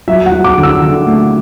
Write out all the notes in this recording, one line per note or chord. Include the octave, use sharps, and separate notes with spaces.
F#3 E5
F#5
F#3
D6
D3
E6
D3
A3